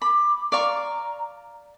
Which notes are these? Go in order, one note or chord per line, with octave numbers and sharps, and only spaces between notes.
B5 D6
D5 F5 A#5 C#6